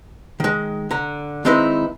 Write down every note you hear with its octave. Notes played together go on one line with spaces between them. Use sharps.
D#3 G#3
D3 A#5
D#3 G#3 C4 D#4 E4 B4